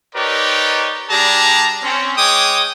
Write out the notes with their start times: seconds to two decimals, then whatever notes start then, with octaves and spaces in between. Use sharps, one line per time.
0.14 D#4 G4 A#4 B4 C#5 D5
1.10 G3 D4 G4 G#4 A5 A#5
1.83 C4 C#4
2.17 G#3 C#5 G5 D6 D#6